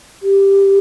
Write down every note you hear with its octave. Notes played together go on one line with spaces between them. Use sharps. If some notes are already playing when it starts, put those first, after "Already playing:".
G4